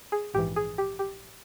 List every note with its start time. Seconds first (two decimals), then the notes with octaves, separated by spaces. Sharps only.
0.12 G#4
0.34 A#1 G#2 E3 G4
0.56 G#4
0.78 G4
0.99 G4